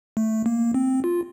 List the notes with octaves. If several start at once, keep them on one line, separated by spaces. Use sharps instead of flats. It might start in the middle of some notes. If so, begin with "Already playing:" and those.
A3
A#3
C4
F4